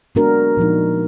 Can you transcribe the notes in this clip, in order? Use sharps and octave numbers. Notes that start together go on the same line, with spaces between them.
G#3 B3 D4 F#4 A#4
A#2 F3 B3 D#4